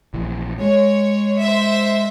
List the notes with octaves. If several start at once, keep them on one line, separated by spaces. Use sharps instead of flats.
A#1 E3
G#3 C#5
C5 E5